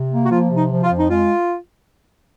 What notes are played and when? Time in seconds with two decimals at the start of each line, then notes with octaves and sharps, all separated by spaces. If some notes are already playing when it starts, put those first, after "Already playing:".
Already playing: C3
0.11 A#3
0.25 F#4
0.31 F3 F4
0.51 C3
0.57 D#4
0.70 F3
0.83 F4
0.90 F2
0.99 D#4
1.10 G#3 F4